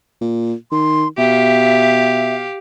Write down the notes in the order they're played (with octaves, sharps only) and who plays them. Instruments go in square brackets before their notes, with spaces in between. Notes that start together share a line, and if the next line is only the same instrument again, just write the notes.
[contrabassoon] A#2
[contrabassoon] D#3 [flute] C6
[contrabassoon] B2 [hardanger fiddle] G4 F5 [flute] E5